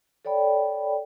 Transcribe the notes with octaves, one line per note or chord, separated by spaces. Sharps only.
A4 C#5 D5 G5 B5